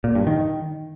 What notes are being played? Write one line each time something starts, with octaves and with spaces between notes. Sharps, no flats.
A#2
G2
D#3